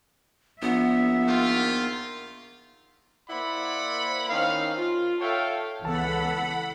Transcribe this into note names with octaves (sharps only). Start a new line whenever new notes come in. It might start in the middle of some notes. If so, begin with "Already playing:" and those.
A#1 B3 E5
D#3 A#3 F4
A#3 E4 C5 D5 F#5 B5
D#3 C4 C#4 D#4 F5
F4
A4 C#5 E5 F5 G5 A5
C#2 E3 B3 A4 F#5 A5 B5